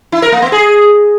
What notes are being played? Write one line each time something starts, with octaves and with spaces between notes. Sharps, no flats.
E4
A#4
A#3
B3
G#4